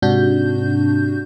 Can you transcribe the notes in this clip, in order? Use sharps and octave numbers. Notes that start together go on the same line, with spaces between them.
G#2 C3 D4 F#4 G6